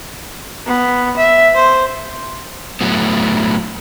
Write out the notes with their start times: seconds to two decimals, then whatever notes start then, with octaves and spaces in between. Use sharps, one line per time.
0.66 B3
1.17 E5
1.55 C5
2.81 A2 F#3 A3 B3